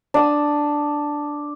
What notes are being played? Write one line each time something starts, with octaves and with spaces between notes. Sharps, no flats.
D4 D#6 E6